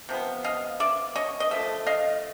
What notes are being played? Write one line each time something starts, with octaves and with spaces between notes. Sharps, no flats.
C3 F3 B3
D#5 F5
D5 E5
C#5 D#5
D#5
D3 F3 A3 E5
D#5 F5